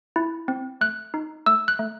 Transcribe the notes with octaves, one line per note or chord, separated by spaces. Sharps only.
E4
C4
A3 F#6
D#4
A3 E6
F#6
A3